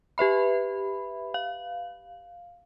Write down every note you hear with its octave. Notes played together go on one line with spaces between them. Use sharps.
G4 B4 E5 B5
F5